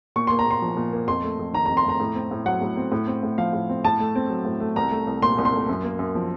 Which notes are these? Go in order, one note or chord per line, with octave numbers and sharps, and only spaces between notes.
A#2 C#6
A#3 C6
A#5
A#2 C6
F3
A#2
A#3
F2 C6
A3
F2
D#3 A#5
F2 A#5
C6
A3 A#5
A2
C4
A2
F#3 F#5
A2
C4
A2
C4
A2
F3 F5
A2
C4
A2 A5
A3
C4
F#3
A2
A3
C2 A#5
A3
C2
A#2 C6
C2
C6
A3
F#2
A#3
F#2
F3